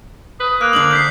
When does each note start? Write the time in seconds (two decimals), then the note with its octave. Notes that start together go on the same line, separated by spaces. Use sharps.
0.40 B4 D#6
0.61 A#3 F#6
0.73 D3 D4 C5 F#7
0.91 G6 B6 C7